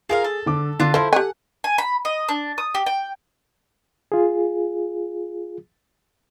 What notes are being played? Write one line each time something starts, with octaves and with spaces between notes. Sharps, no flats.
F4 G#4 A#4 F5
A4
D3 D6
D3 D4 F4
F3 E4 A4 C5
G4 F#5 G#5
G#5
B5
D#5
D4
D#6
G4
G5
F4 G#4